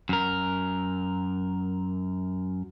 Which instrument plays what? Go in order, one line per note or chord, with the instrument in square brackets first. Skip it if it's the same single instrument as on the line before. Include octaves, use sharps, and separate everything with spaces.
[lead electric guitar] F#2 A#4